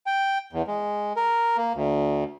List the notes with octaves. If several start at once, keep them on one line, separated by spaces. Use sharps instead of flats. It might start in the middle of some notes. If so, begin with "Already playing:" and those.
G5
E2
G#3
A#4
A#3
D2